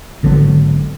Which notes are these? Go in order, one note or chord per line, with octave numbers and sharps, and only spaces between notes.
G#1 D3 F#3 B3